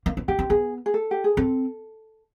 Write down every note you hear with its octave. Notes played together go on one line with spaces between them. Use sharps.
A#3
B3
C4 G4
C4
B3 G#4
G#4
A4
G4
G#4
C4 A4